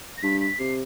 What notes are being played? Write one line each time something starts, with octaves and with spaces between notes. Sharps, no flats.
A#6
G2 B6
B6
C3 C7